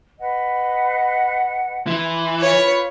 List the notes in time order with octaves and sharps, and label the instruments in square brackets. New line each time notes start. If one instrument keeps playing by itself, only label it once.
[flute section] B4 D#5 F#5
[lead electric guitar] E3 [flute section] C6
[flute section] F4 B4 B5 [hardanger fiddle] C#5